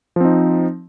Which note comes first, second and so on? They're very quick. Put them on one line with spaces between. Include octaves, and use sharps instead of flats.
F3 C4 D#4